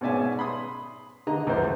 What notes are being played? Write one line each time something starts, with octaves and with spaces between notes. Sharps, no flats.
G#2 B2 C#4 D5 E5 G#5
B5 C6 D#6
D3 D#5 A#5
C#2 F#2 E3 C5